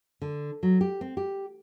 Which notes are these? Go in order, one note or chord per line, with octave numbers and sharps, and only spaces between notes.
D3
F#3
G4
C4
G4